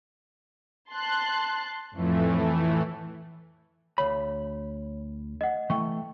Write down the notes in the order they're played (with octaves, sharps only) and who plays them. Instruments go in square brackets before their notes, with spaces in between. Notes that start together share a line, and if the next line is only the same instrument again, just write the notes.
[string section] A5 C6 F#6
[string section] F2 F3 [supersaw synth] A2 E3 A3
[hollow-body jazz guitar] D2 B5 [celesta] C#5
[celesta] D#5 F#5
[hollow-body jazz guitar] E3 A3 [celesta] G5 C#6